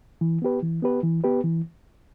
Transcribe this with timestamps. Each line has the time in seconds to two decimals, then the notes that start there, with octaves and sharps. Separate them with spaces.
0.21 E3
0.42 B3 G4 B4
0.63 E3
0.83 B3 G4 B4
1.03 E3
1.24 B3 G4 B4
1.44 E3